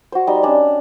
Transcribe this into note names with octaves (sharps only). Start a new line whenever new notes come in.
F#4 C5
G3 D#4 C6
C#4 D4